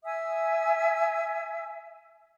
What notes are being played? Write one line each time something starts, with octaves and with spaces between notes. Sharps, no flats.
E5 G#5 D#6 E6